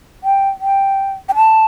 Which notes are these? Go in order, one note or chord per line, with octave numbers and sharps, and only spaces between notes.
G5
G5
G5
A5